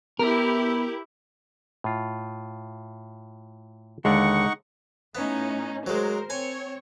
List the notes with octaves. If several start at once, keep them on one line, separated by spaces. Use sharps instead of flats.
B3 E4 G4 A#4
A2 F4
D#2 D3 G#3 D#4 D5 F#5 C#6
A2 B3 C#4 D#4
F#3 G#3 A#4 C5
C4 C#5 G#5